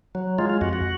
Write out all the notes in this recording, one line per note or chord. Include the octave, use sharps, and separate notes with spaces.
F#3
G#3 F4
F4
F2 F#4
F#4